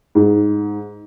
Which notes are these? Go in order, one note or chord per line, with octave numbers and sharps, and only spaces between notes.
G#2